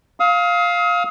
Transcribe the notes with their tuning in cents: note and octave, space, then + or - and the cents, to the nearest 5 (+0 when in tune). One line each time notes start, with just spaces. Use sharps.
F5 +5 D#6 +40